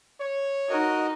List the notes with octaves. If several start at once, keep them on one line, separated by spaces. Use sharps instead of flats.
C#5
D#4 F#4 A#4 D#5